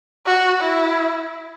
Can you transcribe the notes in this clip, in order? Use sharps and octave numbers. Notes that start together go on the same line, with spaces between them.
F#4
E4